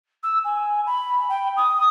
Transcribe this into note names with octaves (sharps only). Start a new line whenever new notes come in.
E6
G#5
B5
G5
D#6